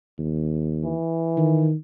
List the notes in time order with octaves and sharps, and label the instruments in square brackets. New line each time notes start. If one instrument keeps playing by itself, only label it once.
[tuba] D#2
[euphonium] E3
[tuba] D#3